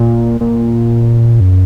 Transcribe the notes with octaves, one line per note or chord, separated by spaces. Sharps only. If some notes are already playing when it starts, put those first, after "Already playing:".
Already playing: A#2
A#2
F#2